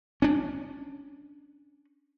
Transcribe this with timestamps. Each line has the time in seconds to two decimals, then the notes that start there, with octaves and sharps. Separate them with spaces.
0.22 C#4 D4